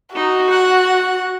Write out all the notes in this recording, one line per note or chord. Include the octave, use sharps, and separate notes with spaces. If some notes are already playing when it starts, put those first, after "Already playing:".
D#4 F#4
F#5